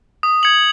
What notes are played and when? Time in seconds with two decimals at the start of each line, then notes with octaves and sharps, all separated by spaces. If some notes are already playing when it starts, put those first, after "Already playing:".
0.23 D#6
0.43 G#6 C#7 F#7